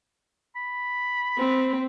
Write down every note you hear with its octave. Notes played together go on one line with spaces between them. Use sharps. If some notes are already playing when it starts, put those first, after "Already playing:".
B5
C4